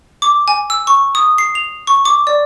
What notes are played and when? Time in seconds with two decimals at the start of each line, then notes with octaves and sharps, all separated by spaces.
0.22 D6
0.48 G#5
0.70 E6
0.87 C#6
1.15 D#6
1.38 C7
1.55 F7
1.87 C#6
2.05 D6
2.27 D5